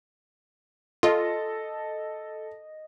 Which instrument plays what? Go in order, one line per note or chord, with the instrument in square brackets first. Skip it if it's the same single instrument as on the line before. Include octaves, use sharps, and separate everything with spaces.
[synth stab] F4 [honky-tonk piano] A4 [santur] D#5